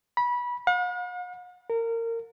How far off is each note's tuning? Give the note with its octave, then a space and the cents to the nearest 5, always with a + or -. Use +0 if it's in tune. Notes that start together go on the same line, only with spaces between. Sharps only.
B5 -20
F#5 -45
A#4 -25